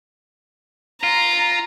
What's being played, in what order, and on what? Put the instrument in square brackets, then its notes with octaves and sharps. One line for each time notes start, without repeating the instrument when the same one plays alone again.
[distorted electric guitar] F4 [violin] A#5